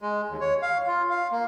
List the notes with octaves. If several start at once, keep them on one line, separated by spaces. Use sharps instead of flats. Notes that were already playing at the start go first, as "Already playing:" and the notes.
G#3
D#2
C#5
F5
F4
F5
A#3